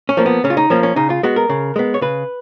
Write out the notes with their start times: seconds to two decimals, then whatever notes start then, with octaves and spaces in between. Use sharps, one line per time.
0.09 C#4
0.17 F3 A#3
0.26 B3
0.44 C#3 C#4
0.50 F4
0.57 D#4
0.70 F3 A#3 C#4
0.83 C#4
0.96 C#3 D#4
1.10 F4
1.23 G#3 B3 F#4
1.36 A#4
1.49 C#3
1.76 G#3 B3
1.94 C#5
2.02 C#3 B4